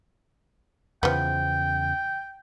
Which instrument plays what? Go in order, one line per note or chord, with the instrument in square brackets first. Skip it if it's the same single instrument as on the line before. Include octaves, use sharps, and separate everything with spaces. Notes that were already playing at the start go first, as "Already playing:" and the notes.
[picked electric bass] E2 C#3 [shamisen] F3 B3 [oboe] G5